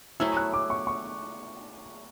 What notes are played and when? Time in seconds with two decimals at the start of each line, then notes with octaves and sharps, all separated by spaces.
0.20 F#3 A3 E4 G#4 E6
0.37 F#6
0.53 D6
0.70 C#6
0.87 C#6